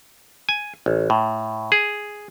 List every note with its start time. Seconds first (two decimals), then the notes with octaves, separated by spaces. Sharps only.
0.49 G#5
0.86 A1
1.10 A2
1.72 G#4